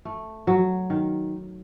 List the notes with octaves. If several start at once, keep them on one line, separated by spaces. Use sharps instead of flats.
A3
F#3
D#3